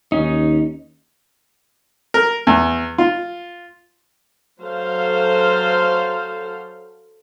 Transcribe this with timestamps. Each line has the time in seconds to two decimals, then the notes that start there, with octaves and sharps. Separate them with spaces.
0.12 D#2 C#4 D#4
2.14 A#4
2.47 E2
2.98 F4
4.61 F#3 A4 C5 F5